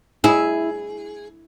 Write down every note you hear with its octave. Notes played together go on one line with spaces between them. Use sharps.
E4 G#4